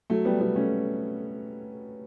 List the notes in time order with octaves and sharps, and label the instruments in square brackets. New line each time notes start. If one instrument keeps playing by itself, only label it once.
[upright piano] F#3 A3
G3 B3
G3 B3
A3 C#4